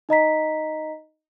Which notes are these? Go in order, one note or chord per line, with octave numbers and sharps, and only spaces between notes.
D#4 D#5 A#5 B6